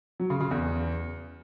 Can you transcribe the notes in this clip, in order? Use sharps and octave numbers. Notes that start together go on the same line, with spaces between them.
F#3
C#3
C#3
E2